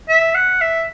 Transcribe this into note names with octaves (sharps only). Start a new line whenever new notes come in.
E5
F#5
E5